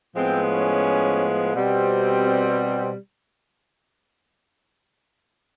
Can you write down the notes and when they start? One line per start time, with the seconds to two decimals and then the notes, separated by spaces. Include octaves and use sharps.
0.16 A2 F3 G#3 B3 C4
0.51 C#4
1.55 B2 G3 C4